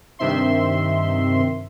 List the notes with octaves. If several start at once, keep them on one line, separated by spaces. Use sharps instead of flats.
G2 C3 D#3 C4 E5 C6